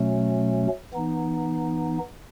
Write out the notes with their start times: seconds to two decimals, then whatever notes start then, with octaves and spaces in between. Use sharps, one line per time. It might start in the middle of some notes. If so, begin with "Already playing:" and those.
Already playing: B2 F#3 A3 C#4
0.94 E3 B3 D#4